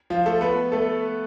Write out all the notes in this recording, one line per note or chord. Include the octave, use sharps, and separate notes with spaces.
F3 F4
A3 A4
B3 B4
A3 A4